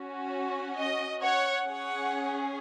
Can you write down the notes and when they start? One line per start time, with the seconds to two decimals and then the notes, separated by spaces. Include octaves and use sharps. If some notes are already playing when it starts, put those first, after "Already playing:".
Already playing: C#4 F#4
0.76 D#5
1.20 C#5 F#5
1.65 C#4 G#4 C#5 F#5